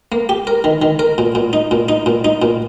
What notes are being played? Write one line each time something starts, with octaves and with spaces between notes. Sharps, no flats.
A#3
G4
A#4
D#3
D#3
A#4
A#2
A#2
D#4
A#2
D#4
A#2
D#4
A#2